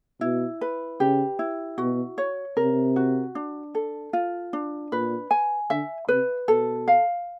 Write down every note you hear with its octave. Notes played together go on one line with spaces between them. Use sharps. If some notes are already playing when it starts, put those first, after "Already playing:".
B2 E4
B4
C#3 G4
E4
B2 F#4
C#5
C3 A#4
F#4
D4
A4
F4
D4
A#2 B4
G#5
D3 E5
C3 B4
B2 A4
F5